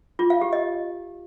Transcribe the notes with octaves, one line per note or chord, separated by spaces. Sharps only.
F4
F5
G4
D#5